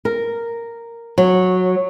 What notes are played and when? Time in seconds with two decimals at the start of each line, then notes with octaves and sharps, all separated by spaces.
0.05 A#4
1.18 F#3